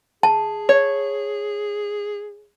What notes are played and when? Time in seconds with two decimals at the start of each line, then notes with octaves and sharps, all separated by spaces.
0.23 G#4 A5
0.69 C#5